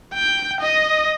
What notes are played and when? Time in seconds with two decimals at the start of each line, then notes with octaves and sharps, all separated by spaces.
0.14 G5
0.61 D#5